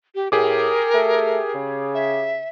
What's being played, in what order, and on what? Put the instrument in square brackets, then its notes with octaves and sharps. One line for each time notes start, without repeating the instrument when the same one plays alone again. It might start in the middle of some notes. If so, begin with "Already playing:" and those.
[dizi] G4
[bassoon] A2 [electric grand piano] G4 G#4 D6 [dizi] A#4
[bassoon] A3
C#3
[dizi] E5